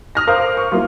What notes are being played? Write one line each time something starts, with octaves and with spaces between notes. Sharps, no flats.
D#6 F6 A#6
A#4 C5 F5 D6
C#6
F#3 A#3 E4 F4